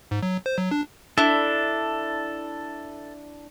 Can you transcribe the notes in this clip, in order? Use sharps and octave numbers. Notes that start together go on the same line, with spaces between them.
G#2
F#3
C5
F#3
D4
D4 E4 A4